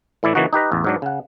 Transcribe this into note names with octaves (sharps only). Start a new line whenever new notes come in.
A2 E3 E4 D5
C#3 E3 A#3 D#4 F#4
D#4 G4 B4 D#5
A1 E2
G#2 F#3 D4
C#3 F#5